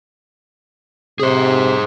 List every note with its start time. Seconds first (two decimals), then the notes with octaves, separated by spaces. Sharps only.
1.20 C3 G#4 C5